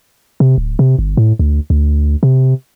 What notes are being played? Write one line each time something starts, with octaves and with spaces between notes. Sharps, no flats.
C3
D1
C3
G1
A2
D2
D2
C3